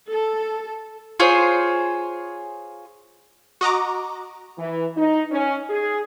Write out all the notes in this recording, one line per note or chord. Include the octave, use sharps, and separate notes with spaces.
A4
F4 G#4 C5 C#5
F#4 D#5 A#5 D6
E3
D#4
C#4
G#4